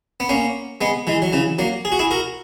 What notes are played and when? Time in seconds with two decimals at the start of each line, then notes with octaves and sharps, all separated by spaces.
0.20 B3
0.29 A#3 C#4
0.81 G#3 B3
1.07 E3 G#3
1.22 F#3
1.33 C#3 E3
1.59 F#3 A#3
1.85 G#4
1.92 F#4
1.99 E4 G#4
2.11 F#4 A#4